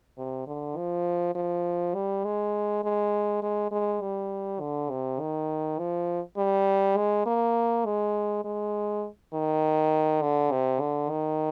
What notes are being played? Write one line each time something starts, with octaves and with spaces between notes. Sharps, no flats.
C3
D3
F3
F3
G3
G#3
G#3
G#3
G#3
G3
D3
C3
D#3
F3
G3
G#3
A#3
G#3
G#3
D#3
D3
C3
D3
D#3